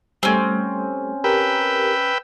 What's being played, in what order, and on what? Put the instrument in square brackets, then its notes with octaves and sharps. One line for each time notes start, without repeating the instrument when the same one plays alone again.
[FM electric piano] G3 A3 [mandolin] C4 C#4
[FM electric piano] G4 A#4 [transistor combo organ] B4 G5 E6